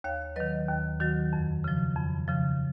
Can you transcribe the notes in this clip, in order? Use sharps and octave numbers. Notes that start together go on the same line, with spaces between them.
D#2 C#5 F5
D#3 F#3 B4 D#5
D#2
D#3 F#3 F#4
F2
C#3 F3
F2
C#3 F3